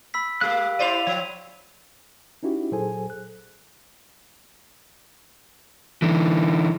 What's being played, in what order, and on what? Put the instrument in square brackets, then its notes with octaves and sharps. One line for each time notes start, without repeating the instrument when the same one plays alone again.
[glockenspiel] B5 E6 B6
[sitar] G#3 A#3 [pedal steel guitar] G4 F#6 [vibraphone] F5
[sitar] E4 C5 D5 [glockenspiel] D#7 F7
[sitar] F3 [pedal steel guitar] C#5
[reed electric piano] C#4 D#4 E4 F#4 G4
A#2 F#3 G#4 A4 C5 G#5
F#6
[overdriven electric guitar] D3 E3